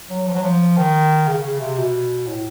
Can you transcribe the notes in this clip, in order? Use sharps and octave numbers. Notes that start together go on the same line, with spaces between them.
F#3
F3
F#3
F3
D#3
C#3
C#3
C3
B2
A2